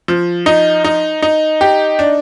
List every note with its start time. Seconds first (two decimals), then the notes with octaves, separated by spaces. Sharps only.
0.08 F3
0.46 D#4
0.84 D#4
1.22 D#4
1.61 G4
1.99 D4